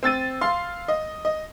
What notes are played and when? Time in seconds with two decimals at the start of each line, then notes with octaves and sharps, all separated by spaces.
0.03 C4 E6 A6 D#7
0.41 F5 C6
0.88 D#5
1.25 D#5